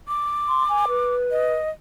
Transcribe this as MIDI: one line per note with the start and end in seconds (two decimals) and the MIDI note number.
0.08 1.15 86
0.48 0.67 84
0.69 0.86 80
0.88 1.55 71
1.31 1.69 75